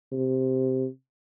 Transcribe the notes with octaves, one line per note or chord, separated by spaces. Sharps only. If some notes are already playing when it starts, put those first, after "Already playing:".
C3